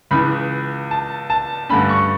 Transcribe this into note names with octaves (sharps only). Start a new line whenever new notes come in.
C#2 C#3 E3 B5
A5
A5
G2 D3 A3 C#4 B5
C#6